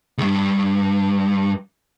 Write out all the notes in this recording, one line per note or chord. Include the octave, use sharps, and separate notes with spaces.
C#2 G2